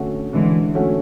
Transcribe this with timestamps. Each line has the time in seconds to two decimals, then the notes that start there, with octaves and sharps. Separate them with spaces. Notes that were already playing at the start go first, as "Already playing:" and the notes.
Already playing: D3 A3 C#4 F#4
0.33 D3 E3 G#3
0.75 A3 C#4 F#4